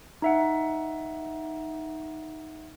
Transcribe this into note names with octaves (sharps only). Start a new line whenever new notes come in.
D#4 E5 F#5